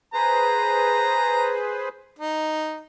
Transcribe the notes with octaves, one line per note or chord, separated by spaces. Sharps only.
G#4 B4 C5 A#5
D#4